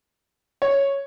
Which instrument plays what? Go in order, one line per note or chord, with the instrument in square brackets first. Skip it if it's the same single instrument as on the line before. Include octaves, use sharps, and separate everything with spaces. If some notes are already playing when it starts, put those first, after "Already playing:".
[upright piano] C#5